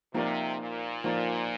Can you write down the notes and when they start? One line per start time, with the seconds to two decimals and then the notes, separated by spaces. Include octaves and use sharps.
0.14 C3 F3 A#3 D#4 A#4 D5
0.59 A#2
1.04 F3 A#3 D#4 A#4 D5